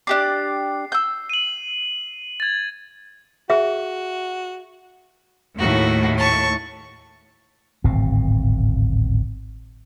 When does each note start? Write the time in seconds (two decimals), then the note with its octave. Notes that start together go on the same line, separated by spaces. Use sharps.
0.07 D4 G4 D5 C7
0.92 E6 G6
1.30 D#7 F#7
2.40 G#6 A6
3.50 F#4 G#4 E5
5.59 D#2 A2 F#4
6.18 A5 C#6
7.84 D1 G#1 B2 C4